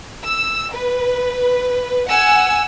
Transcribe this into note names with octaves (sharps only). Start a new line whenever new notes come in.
E6
B4
F#5 G#5 E6